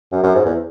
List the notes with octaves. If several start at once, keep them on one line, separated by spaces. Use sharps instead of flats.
F#2
F#2
G#2
E2